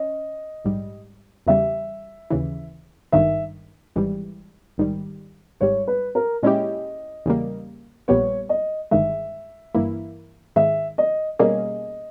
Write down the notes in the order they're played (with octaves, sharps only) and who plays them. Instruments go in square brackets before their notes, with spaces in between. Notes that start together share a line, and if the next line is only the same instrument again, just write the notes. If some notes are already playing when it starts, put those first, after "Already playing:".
Already playing: [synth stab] C#4 [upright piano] D#5
[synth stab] A#1 G#2 G3
[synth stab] E2 C#3 G3 [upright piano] E5
[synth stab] D#2 C#3 E3
[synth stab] G#1 G2 D#3 [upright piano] E5
[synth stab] G#1 G#2 E3 G3
A#1 G#2 D#3 G3
[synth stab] G#1 G#2 G3 [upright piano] C#5
[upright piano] B4
A#4
[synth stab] A#2 G#3 C#4 E4 G4 [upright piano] D#5
[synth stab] E2 C#3 G3 A#3
[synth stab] A#1 A#2 G3 B3 [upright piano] C#5
[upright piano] D#5
[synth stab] G1 G2 D#3 G#3 [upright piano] E5
[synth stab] G1 G2 E3 A#3 E4
[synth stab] G#2 D#3 G#3 [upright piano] E5
[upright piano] D#5
[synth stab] B2 G3 A#3 C#4 G#4 [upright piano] D#5